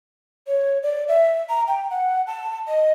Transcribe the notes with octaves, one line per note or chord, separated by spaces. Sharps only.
C#5
D5
E5
A#5
G5
F#5
A5
D#5